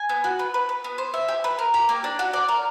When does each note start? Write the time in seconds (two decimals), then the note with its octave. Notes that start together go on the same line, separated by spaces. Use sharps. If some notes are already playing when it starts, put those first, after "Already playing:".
Already playing: G#5
0.09 B3
0.24 F#4
0.39 B4
0.54 B4
0.69 B4
0.84 B3
0.98 C5
1.14 E5
1.28 G4
1.44 B4
1.59 A#4
1.74 G4
1.89 A#3
2.04 D4
2.19 F#4
2.33 D5
2.48 A#4